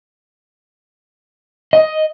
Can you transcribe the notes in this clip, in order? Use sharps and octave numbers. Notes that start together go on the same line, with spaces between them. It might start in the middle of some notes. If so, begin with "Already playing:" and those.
D#5